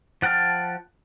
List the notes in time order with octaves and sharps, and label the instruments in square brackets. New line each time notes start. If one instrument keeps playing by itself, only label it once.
[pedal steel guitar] F3 F#5 G5 A5 F6